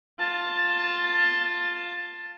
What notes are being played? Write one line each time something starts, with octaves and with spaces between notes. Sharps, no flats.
F4 A5